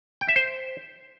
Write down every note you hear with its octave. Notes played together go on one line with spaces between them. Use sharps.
G5
E5
C5